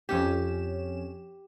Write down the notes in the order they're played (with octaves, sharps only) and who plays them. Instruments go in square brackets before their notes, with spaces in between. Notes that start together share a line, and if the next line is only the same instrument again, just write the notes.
[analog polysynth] F2 C#4 E7 [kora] G4